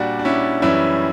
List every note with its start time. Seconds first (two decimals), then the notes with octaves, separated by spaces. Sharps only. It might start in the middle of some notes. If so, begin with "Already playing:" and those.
Already playing: A#2 G3 D4 F#4
0.19 D4
0.25 C#4 E4
0.62 F#2 E3 G3 C#4 E4